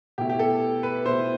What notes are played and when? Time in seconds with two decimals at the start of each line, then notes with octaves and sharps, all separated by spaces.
0.18 B2 A3 E4 G4
0.29 G4
0.39 A4
0.83 B4
1.05 B2 A3 E4 C5